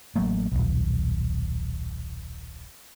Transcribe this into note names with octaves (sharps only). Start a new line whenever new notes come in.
A1 F#3 A3 A#3
D#1 B1